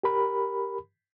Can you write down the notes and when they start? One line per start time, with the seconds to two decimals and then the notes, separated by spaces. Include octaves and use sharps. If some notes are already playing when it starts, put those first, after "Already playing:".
0.03 G4 A#4 B5